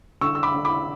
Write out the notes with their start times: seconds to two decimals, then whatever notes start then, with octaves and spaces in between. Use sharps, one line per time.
0.21 D3 C#6 E6
0.35 E6
0.43 B5 D6
0.54 D3
0.65 B5 D6